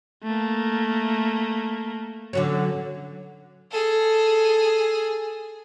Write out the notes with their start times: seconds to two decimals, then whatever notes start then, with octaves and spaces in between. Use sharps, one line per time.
0.23 A3 A#3
2.33 D3 F#3 C#4
3.71 G#4 A4